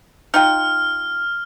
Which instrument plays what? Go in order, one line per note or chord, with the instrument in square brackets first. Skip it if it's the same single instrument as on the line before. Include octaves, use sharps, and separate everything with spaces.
[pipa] D#4 F4 G5 [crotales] F6